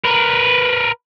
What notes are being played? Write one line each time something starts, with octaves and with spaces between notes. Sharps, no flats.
A#4 B4